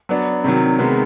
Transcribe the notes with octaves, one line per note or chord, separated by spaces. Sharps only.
F#3 B3 D4
C3 D#3 F#3
C3 D#3 G#3 B3